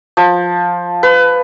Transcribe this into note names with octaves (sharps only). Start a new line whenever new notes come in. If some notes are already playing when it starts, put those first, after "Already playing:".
F3
B4